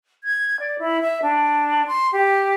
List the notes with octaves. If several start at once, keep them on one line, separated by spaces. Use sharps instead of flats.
G#6
D5
E4
E5
D4
C6
G4